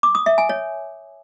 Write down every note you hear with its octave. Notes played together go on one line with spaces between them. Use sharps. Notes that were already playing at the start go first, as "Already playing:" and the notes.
D6
D#6
E5
G#5
C#5